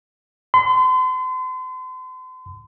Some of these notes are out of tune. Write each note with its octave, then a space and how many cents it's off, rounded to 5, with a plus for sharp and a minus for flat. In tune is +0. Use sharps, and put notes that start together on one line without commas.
C6 -40